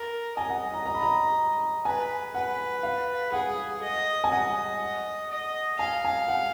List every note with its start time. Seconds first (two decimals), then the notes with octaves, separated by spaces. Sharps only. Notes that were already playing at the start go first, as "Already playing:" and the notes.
Already playing: A#4
0.37 D#5 G#5
0.49 F#5
0.74 A#5
0.86 A#5
0.95 B5
1.03 A#5
1.85 B4 G#5
2.34 B4 F#5
2.83 F5
3.33 G#4 F#5
3.82 D#5
4.24 G#5
4.31 D#5 F#5
5.30 D#5
5.79 F5 G#5
6.04 G#5
6.28 F#5